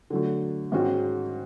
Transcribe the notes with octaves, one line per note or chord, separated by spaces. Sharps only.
D3 F#3 A3
G#2 D#3 G#3 C#4 F#4